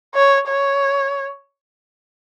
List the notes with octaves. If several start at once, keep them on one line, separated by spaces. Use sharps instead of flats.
C#5
C#5